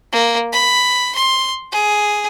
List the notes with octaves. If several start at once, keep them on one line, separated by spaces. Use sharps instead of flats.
A#3
B5
C6
G#4